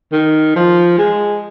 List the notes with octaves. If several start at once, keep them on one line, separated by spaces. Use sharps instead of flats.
D#3
F3
G#3